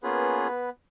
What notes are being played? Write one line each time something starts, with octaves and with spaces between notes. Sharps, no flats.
A#3 B3 C#4 F4 G#4 B4